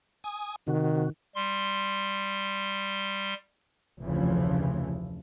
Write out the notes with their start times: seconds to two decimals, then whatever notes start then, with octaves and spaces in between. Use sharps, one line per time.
0.24 G#5 D#6
0.67 C3 D#3 F#4
1.35 G3 C6
4.01 F1 D2 C#3 E3 F3